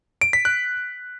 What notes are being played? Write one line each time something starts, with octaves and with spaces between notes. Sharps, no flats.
D7
B6
F#6